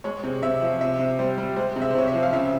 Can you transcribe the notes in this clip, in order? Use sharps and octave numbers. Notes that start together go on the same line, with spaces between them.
G#3 C#5
C3
C3 E5
F3
C3 E5
C3
G3 C5
G3
G#3 C5
C3
E5
C5
C3 C#5
E5
F3
F5
C#3 E5